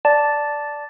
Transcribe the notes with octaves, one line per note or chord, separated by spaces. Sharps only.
D5 A5